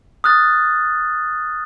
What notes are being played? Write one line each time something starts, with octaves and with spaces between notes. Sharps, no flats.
D#6 F6 F#6 A6